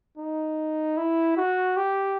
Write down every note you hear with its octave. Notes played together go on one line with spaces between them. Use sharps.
D#4
E4
F#4
G4